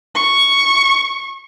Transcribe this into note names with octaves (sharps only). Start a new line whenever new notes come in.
C#6